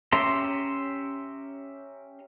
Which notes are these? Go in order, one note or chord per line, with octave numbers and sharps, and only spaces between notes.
C#4 G4 E5 A#5 C6